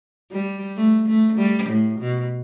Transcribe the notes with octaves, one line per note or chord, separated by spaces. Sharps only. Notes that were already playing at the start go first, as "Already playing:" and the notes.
G3
A3
A3
G3
A2
B2